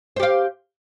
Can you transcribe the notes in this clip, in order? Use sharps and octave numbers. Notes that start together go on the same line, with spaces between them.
G4 C5 F5